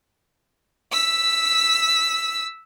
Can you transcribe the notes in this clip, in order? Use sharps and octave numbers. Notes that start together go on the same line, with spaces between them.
E6 B6